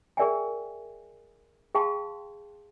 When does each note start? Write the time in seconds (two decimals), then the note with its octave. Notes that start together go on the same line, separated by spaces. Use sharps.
0.17 G#4 A#4 D5 E5 G5 G#5
1.75 G#4 F5 G5 A5 C6